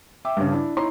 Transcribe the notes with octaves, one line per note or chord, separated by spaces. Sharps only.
E5 G5 D6
G2 C#3
D4 E4
D#4 E4 C#5 A#5 C6